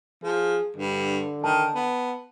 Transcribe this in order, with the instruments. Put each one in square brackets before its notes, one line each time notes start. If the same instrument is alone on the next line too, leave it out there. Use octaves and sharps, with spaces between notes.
[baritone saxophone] F3 [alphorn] G#4
[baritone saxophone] G2 [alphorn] D3
[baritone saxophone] D#3 [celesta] A5
[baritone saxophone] B3